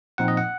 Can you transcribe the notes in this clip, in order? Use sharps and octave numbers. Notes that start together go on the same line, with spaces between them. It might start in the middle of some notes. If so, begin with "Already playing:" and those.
A#2 F3 C4 D#4 F#5
D#5
F#5